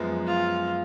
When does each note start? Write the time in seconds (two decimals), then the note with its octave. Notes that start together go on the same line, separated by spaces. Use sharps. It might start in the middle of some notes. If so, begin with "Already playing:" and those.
Already playing: F#2 F3 G#3 B3
0.27 F4